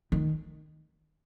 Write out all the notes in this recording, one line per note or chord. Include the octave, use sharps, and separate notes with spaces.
D#3